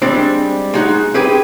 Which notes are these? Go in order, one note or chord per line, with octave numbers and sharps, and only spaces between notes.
G3 G#3 C4 D4
G#3 D#4 F#4
C4 G4 G#4 B4